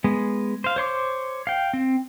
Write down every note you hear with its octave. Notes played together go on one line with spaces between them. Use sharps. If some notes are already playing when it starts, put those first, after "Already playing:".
G#3 B3
C5 F5
C5 C#5 C6 D6
F5 G5
C4